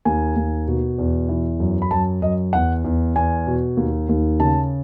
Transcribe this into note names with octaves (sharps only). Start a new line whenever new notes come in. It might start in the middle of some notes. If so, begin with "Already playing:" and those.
D#2 G#5
D#2
B2
E2
E3
F#2
B5
F#2 A5
F#2 D#5
E2 F#5
E2
E2 G#5
B2
D#2
D#2
C#3 A5